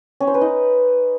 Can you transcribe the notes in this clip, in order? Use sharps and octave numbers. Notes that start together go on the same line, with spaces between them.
C#4
C5
B4
D#4